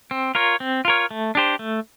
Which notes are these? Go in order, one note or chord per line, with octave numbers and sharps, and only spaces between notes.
C4
F4 A#4 C#5
C4
F4 A#4 C#5
A3
D4 G4 C5
A3